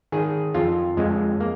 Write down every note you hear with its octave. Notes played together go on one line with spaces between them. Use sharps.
D#3 G#4
F2 F4
F2 G#3
A#3